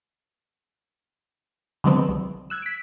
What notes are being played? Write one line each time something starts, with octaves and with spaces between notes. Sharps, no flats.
D3 D#3 F#3 G#3 B3 C4
C2
E6 F#6 G#6
B6 D7